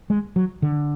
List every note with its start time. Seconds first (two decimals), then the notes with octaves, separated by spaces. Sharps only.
0.10 G#3
0.36 F#3
0.62 D3